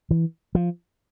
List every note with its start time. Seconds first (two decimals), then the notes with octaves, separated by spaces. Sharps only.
0.11 E3
0.55 F3